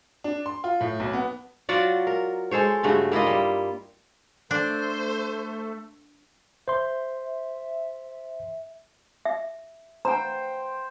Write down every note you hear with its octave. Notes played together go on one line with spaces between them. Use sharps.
D4
C6
F4
A2
B1
B3
F#3 F4 F#4 D5
A#4
G#3 A4 C5 C#5
G2 C#3 A3 F#4
A#3 E4 F4 D#5
G3
A3 D4 A4 C5
C5 E5 C6
E5
C5 G5 A#5